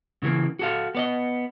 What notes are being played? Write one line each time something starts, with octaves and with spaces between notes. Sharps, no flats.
C#3 E3 A3 A#3
F#4 A4 F5
B3 D5 D#5